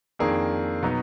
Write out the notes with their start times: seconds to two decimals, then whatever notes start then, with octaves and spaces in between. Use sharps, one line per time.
0.19 F2 D#3 A#3 D4 G#4
0.83 B2 F#3 B3 D#4